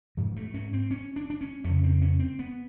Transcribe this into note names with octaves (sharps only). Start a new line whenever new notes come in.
G#2 F3
A3
C#4
C4
C#4
D4
D4
C#4
F2 C#3 C#4
C4
C#4
C4
B3